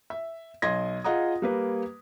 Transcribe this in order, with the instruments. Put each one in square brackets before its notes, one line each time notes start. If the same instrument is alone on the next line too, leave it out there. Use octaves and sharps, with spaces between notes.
[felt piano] E5
B1 D#5 C6 G#6 A#6
F4 G#4 D#5 F#5 A#5 D#6
G3 A#3 B4